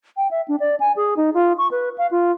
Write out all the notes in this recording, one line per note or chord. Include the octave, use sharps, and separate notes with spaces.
G5
E5
D4
D5
G#5
G#4
D#4
F4
C#6
B4
F5
F4